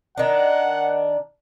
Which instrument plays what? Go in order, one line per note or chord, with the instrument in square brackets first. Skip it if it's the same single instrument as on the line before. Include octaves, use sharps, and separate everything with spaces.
[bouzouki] D#3 D4 [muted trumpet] F#5